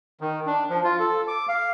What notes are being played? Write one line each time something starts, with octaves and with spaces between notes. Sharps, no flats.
D#3
D4
F3
F4
A4
D6
F5